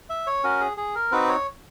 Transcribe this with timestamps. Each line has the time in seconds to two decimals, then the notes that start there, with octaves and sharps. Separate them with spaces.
0.10 E5
0.27 C#5
0.44 C#4 F#4 A#4
0.61 G#4
0.77 G#4
0.95 A#4
1.12 C4 D#4 F#4 B4
1.29 C#5